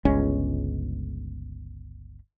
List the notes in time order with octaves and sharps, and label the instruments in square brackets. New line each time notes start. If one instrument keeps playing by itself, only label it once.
[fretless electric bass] G1 C#2 G#3 C#4